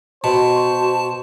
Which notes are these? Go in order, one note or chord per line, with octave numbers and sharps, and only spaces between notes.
B2 F#4 C5 A5